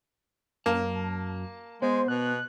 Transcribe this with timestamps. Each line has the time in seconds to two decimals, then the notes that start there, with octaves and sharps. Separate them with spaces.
0.66 F#2 A#3 A5
1.82 G#3 B3 C5
2.08 B2 F#6